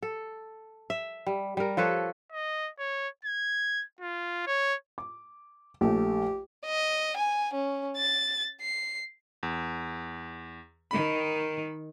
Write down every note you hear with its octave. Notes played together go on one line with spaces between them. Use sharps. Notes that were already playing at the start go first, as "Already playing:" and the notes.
A4
E5
G3
G3 A#4
F3 A4 B4 C#5
D#5
C#5
G#6
F4
C#5
D6
A#1 A3 G4
D#5
G#5
C#4
A6
C7
E2
D#3 B5